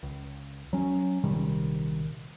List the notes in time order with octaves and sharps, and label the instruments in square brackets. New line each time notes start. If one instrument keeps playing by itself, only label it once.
[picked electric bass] C#2
F#3 C#4
A#1 C3 D#3 G3